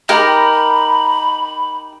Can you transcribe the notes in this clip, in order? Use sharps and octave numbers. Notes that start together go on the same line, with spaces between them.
D#4 G4 A#4 B5